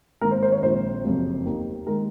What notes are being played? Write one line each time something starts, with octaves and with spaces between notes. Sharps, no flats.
G#1 G#2 D#3 A#3 A#4
C5
C5
C#5
A#1 A#2 G#3 C4 C5
F#1 F2 C3 F#3 A#3
D#2 D#3 A#3
D#3 G#3 A#4